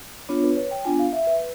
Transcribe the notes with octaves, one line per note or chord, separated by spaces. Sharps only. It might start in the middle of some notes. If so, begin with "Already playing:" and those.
B3 D4 F4 C#5
B4
C#5
G5
B3 D4 F4 G#5
F5
E5
B4